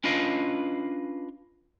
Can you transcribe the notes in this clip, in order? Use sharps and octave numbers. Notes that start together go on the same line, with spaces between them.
C#4 D4 F4 B4 D#5 F5